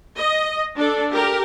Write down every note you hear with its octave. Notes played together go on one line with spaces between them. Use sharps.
D#5
D4 A4
G4 A#4